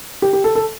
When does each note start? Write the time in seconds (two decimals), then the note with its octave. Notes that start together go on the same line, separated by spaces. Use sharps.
0.22 G4
0.33 G4
0.44 A4
0.55 A4